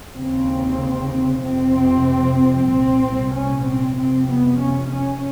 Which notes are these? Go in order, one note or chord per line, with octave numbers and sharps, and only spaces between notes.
D#2 C#3 C4
F2 C3 C4
C2 A#2 C4
C#4
C4
F2 C3 C4
B3
C#4
C#4